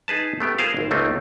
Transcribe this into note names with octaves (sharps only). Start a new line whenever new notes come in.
D#4 G#4 B4 A5
A3 B3 G4
F4 G#4 A#4 C5 F5
G#1
C#2 A3 A#3 C4 D#4